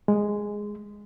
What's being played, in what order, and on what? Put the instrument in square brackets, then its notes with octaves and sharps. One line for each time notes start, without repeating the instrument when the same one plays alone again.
[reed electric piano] G#3